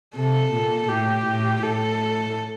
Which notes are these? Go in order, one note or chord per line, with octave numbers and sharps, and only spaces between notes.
C3 A4
A#2
A2 G4
A2
A2 A4